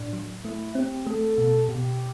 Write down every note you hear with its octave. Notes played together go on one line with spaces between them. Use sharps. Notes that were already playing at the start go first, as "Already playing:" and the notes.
Already playing: A2 D4
F#3
A3 E4
C4 G4
A3 A4
B2
B2 G4